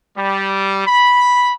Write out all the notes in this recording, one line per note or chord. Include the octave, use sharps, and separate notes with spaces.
G3
B5